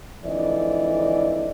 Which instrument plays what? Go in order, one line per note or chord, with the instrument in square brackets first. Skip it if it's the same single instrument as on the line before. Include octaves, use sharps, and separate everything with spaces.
[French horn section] F2 G#2 D3 E3 D5 D#5